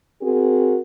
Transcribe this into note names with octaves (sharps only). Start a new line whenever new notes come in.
C4 F#4 G#4 A#4